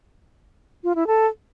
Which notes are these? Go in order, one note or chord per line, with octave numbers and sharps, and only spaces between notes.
F4
E4
A4